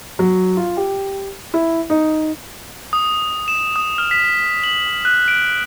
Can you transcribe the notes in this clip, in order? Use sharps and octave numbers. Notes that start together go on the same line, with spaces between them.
F#3
F4
G4
E4
D#4
D#6
E7
D#6
F6
B6
F#7
F#6
D7